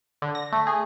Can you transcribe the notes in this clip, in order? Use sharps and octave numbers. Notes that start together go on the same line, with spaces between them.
D3
A#6
A3
G#4